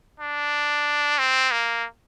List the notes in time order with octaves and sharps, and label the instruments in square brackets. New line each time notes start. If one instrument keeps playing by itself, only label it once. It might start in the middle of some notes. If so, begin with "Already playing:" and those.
[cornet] D4
C4
A#3